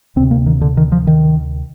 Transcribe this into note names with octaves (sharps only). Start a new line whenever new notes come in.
D2 C3 C4
A#3
D#3
D3
D#3
F3
D#3